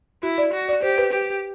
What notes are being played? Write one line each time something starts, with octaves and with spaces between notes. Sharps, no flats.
E4 F#4
D5
F#4
D5
G4 C5
B4
G4